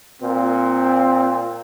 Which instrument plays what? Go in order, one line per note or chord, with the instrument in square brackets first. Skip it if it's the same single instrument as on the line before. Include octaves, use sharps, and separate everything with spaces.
[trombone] A#2 [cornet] C4